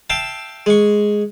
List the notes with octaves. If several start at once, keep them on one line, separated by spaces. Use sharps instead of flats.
E5 F5 G5 A5
G#3 C#6